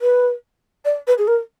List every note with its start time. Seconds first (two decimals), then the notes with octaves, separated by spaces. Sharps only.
0.01 B4
0.85 D5
1.07 B4
1.18 G#4
1.27 A#4